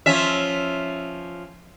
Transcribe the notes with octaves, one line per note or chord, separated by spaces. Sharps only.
F3 C#4 E5